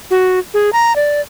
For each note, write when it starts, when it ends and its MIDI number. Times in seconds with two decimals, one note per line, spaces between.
0.11 0.39 66
0.54 0.70 68
0.73 0.95 82
0.96 1.21 74